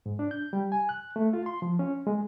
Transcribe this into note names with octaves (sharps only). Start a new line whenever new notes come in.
G#2
D4
G6
G3
G#5
F#6
A3
F4
C6
F3
C#4
G#3